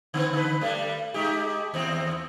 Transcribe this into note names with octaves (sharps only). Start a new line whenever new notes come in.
D3 B3 C4
D3 B4
G3 A3
G#3 D#4 G4
D#2 C4